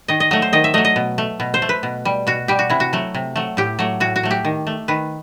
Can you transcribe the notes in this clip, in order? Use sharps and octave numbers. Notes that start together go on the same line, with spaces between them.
D#3 D#5
D#5
F#3 A3 D#5
C5
D#3 D#5
E5
F#3 A3 D#5
D#5
B2
A3
B2
C5
A3
B4
B2
G3
B2 F#4
G3 G4
F#4
C3 E4
F#4
F#3 A3
C3
F#3 A3
A2 G4
F#3 A3
A2 F#4
F#4
F#3 A3
G4
D#3
A3
D#3 B4